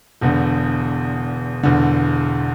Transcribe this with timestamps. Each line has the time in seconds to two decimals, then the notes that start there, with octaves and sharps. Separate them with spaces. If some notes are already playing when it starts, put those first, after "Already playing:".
0.21 E1 E2 D3
1.63 E1 E2 D3